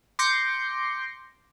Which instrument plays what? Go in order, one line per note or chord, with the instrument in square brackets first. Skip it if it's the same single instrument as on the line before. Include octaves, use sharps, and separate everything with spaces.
[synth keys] C6 D6 G6 A#6 C7 C#7